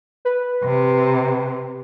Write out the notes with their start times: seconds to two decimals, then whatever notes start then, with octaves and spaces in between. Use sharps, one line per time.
0.25 B4
0.64 C3